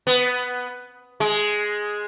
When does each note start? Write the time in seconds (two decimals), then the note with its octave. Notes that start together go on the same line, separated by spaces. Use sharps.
0.07 B3
1.20 G#3